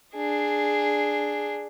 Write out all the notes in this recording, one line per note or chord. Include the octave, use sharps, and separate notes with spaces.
D4 G#4